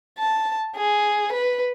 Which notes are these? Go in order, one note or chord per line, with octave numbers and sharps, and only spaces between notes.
A5
G#4
B4